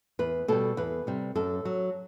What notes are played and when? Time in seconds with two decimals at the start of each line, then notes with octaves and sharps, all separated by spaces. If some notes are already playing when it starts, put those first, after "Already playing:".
0.19 E2 B4
0.48 B2 G3 A4
0.77 E2 B4
1.07 C3 G3
1.35 F#2 A4
1.65 F#3